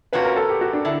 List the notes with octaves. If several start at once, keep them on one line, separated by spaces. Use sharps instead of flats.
C3 F3 A#3 C#4 F#4 B4
A#4
A4
G4
F#4
D4
D3 E4